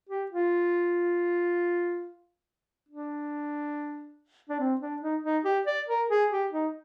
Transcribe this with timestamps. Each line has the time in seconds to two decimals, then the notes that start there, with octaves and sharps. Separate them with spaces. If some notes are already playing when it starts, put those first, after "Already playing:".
0.09 G4
0.31 F4
2.89 D4
4.49 D4
4.59 C4
4.81 D4
5.02 D#4
5.23 D#4
5.44 G4
5.67 D5
5.88 A#4
6.10 G#4
6.31 G4
6.52 D#4